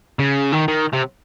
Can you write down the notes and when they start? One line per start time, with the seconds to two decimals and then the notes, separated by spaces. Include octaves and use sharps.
0.19 C#3
0.52 D#3
0.68 D#3
0.93 C3